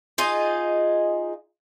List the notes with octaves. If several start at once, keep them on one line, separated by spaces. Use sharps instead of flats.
D#4 F4 G#4 D#5